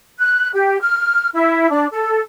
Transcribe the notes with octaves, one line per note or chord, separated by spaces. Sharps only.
F#6
G4
F6
E4
D4
A4